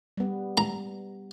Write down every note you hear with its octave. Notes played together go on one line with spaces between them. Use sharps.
G3 B3
A#5